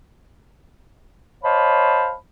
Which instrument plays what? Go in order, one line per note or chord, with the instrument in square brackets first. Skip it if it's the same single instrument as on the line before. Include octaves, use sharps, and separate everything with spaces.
[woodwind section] C5 C#5 D#5 F5 A5 B5